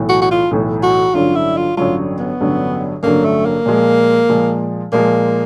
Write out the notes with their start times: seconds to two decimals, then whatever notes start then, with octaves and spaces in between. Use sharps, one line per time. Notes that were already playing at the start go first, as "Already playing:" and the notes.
Already playing: B1 A2 E3
0.09 F#4
0.21 F#4
0.31 F4
0.51 B1 A2 E3
0.83 F#4
1.14 A1 G2 D3 F#3 F4
1.35 E4
1.57 F4
1.77 A1 G2 D3 F#3 F4
2.19 B3
2.41 A1 G2 D3 F#3
3.03 A1 G2 D3 F#3 A#3
3.25 A3
3.46 A#3
3.66 A#2 F3 G#3
4.29 A#2 F3 G#3
4.92 A#2 F3 G#3 A#3